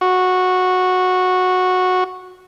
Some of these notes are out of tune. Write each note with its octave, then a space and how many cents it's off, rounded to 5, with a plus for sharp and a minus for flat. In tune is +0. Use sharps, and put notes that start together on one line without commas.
F#4 -10